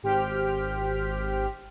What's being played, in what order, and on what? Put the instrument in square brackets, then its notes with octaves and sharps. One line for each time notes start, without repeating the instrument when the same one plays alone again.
[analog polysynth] G#1 G4 C5 G5 F6 B6